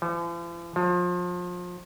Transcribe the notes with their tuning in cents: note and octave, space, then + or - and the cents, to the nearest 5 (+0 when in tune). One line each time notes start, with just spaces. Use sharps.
F3 -45
F3 +30